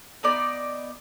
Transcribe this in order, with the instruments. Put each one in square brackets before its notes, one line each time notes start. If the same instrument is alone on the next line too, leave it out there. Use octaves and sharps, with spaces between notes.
[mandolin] B3 D#4 D5